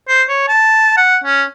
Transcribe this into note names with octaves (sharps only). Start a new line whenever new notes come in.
C5
C#5
A5
F#5
C#4